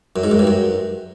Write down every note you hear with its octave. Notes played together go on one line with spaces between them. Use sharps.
F#2
G#2
F#2
G2
F#2